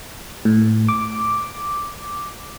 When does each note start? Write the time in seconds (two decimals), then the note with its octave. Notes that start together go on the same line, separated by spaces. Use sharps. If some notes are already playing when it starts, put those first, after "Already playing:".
0.45 A2
0.88 D6